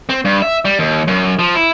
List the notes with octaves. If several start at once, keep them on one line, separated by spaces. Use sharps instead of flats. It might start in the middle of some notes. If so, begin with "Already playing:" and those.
C4
G2
E5
G3
D#2
F#2
F3
E4